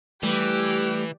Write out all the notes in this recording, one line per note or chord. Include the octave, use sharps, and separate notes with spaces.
E3 G3 A3 G4 B4